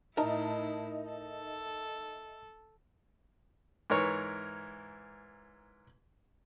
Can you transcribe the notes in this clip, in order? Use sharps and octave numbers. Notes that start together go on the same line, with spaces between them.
A2 D#4 E4 A#4 D#5 E5 A5 A#5
A4
G#2 E3 A#4 C#5